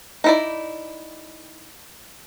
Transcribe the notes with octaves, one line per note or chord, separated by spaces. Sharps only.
D#4 E4 D5